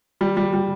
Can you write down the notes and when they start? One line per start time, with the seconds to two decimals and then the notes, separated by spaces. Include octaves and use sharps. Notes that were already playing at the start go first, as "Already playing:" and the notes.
0.21 G3
0.37 G3
0.53 G3